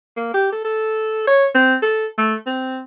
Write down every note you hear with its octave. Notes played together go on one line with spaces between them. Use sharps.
A#3
G4
A4
A4
C#5
C4
A4
A3
C4